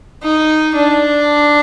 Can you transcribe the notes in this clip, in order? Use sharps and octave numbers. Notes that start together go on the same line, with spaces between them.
D#4
D4